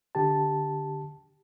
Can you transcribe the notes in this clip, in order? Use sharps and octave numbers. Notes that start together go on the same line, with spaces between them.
D3 G4 A5